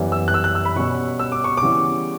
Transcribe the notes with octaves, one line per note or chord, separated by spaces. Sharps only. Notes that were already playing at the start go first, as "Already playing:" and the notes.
Already playing: F#2 E3 G3 B3
E6
F#6
E6
F#6
E6
B5
B2 G3 C#4 C#6
E6
D6
C#6
D6
C#3 E3 G3 B3 E4